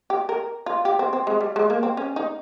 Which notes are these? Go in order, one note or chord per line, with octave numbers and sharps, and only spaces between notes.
G4
A#4
F4
G4
C4
C4
G#3
G3
G#3
A#3
C4
C#4
D#4